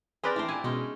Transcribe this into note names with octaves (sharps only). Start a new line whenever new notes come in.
C4 G4 G#4 A#4 B4 D5
E3 A3 D4 C5
A#2 E4 G#5
B2 G#3 C#4 D#4